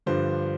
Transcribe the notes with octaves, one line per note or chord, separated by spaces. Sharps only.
G2 D3 F3 C5